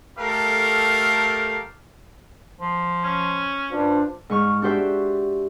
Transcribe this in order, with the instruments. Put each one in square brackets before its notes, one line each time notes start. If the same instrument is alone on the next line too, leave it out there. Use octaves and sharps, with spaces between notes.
[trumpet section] A3 G4 A4 A#4 F5
[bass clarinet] F3
[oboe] C#4
[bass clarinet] G2 [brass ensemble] D4 F4 C5
[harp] G#2 C#6 F6
D4 F#4 G4 C5 E5